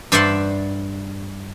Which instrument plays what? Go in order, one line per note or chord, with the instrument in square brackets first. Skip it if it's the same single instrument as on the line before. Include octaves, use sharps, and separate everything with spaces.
[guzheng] G2 C5 D5 E5 F#5 C6